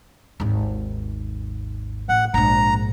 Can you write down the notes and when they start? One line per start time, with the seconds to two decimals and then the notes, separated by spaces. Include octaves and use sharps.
0.40 G#1 D#2
2.09 A1 F#5
2.34 A#1 G#2 A#5